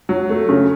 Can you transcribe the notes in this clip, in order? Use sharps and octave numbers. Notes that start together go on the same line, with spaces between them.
F#3
A3
C#3